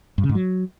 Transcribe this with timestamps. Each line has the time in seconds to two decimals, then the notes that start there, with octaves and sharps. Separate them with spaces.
0.18 G2
0.24 C#3
0.29 G#2
0.35 F#3